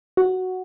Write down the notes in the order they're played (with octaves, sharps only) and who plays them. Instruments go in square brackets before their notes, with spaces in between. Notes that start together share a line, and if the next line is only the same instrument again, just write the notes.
[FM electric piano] F#4